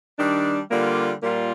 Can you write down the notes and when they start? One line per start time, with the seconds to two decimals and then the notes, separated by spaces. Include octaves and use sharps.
0.18 D#3 G3 D4
0.70 D3 G3 A#3 F4
1.22 A#2 G3 A#3 F4